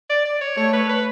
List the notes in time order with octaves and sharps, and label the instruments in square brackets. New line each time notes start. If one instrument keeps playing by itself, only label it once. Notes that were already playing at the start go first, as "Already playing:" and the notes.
[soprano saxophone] D5
D5
C#5
[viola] A3 [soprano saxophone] C#5
[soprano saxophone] B4
B4